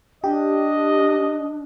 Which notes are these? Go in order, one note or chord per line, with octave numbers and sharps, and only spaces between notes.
D4 G4 D#5